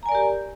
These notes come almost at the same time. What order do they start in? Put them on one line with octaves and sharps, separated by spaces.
A#5 G#5 D5 A#4 G4